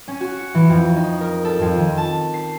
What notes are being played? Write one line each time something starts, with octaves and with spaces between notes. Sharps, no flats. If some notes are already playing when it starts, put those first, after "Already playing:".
C#4
F#4
C#7
E3
F2
D#4
A#4
A4
F2
D#3
A5
C7